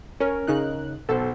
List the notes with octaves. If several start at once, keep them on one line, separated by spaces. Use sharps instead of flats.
C#4 A#4
C#3 D#4 F#6
B1 A4 C5